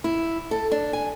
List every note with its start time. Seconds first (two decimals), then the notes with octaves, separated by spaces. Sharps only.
0.04 E4
0.51 A4
0.72 D4
0.93 G#5